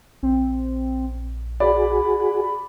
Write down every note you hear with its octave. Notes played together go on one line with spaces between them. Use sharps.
A#1 C4
F#4 G#4 D5 B5